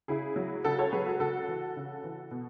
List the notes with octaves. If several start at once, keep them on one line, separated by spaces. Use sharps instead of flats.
C#3 E4 G#4
F#3
C#3 F#4 A4
A4 C#5
F#3 G#4 B4
F#4 A4
C#3 F#4 A4
E3
C#3
E3
B2